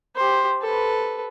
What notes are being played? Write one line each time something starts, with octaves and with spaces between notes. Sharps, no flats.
G4 C5
A4 B4